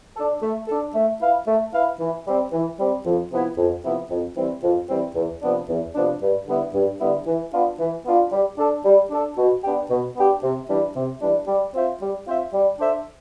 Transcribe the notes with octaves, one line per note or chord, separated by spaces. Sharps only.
D4 A4
A3
D4 A4
A3
E4 B4 F5
A3
E4 B4 F5
E3
G3 C4
E3
G3 C4
F2
C3 F3 B3 E4
F2
C3 F3 B3 E4
F2
E3 G3 C4
F2
E3 G3 C4
E2
C3 F3 B3 D4
E2
C3 F3 B3 D4
G2
D3 G3 B3 E4
G2
D3 G3 B3 E4
E3
B3 D4 F4
E3
B3 D4 F4
G3
D4 A4
G3
D4 A4
B2
B3 D4 G4
B2
B3 D4 G4
C3
E3 G3 D4
C3
E3 G3 D4
G3
C4 F4 C5 E5
G3
C4 F4 C5 E5
G3
D4 A4 C5 E5